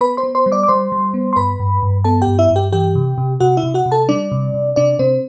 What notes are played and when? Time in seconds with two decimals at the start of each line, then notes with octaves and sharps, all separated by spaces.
0.01 B3 B4 B5
0.17 C5 C6
0.23 B3
0.35 C5 C6
0.46 G3
0.52 D5 D6
0.63 D6
0.68 G3 C5 C6
0.92 G3
1.14 B3
1.33 C6
1.36 G2 B4 B5
1.60 G2
1.83 G2
2.04 B3 A4 A5
2.22 G4 G5
2.27 G2
2.39 E4 E5
2.50 G2
2.56 G4 G5
2.72 E3 G4 G5
2.95 C3
3.18 C3
3.40 C3 F#4 F#5
3.57 E4 E5
3.63 C3
3.74 F#4 F#5
3.86 C3
3.91 A4 A5
4.09 G3 D4 D5
4.32 C3
4.54 C3
4.76 C3 D4 D5
4.99 C3 C4 C5